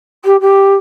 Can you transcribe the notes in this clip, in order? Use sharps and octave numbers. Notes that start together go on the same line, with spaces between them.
G4
G4